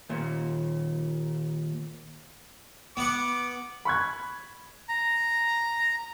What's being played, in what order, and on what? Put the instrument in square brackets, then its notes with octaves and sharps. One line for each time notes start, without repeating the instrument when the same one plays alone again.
[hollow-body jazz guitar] D#2 A#2
[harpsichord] B3 F#5 [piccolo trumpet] D6
[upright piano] B5 C#6 F#6 G#6
[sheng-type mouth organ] A#5